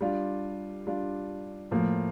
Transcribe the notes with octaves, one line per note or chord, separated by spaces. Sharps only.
G3 D4 F4
G3 D4 F4
A2 F3 A#3